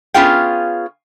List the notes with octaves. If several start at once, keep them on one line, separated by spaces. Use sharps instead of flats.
B3 C#4 F4 G#4 F5 G5